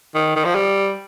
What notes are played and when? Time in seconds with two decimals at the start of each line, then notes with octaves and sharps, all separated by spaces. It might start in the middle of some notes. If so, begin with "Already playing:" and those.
0.15 D#3
0.36 D#3
0.45 F3
0.55 G3